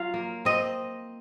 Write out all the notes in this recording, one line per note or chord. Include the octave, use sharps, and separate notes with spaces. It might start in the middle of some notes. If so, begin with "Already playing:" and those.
Already playing: F#3 F4 F5
A#3
C4 D#5